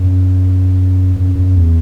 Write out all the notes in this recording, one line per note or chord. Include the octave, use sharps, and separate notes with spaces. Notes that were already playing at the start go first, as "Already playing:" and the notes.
Already playing: F#2
F#2
F#2
E2